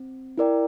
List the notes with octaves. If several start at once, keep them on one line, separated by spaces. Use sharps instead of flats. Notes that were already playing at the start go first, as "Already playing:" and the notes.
Already playing: C4
E4 A#4 D5 G5